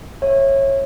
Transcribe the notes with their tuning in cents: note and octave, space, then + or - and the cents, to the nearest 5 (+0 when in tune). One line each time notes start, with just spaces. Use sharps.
C#5 -20 E5 +5